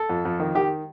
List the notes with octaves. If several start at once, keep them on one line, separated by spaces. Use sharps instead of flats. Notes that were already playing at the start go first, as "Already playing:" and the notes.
Already playing: A4
F2
F2
D#3
D#3 G4